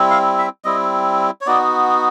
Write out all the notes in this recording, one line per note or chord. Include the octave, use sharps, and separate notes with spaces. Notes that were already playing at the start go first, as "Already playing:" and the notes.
Already playing: G3 C4 E4
F5
E5
G3 C4 E4 D#5
C#5
B3 D#4 F#4 D5